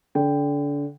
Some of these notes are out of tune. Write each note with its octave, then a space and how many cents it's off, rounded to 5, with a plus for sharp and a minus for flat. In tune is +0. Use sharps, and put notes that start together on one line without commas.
D3 -30 G5 +0